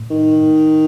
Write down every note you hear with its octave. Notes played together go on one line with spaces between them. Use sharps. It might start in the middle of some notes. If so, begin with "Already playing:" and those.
Already playing: A2
D#3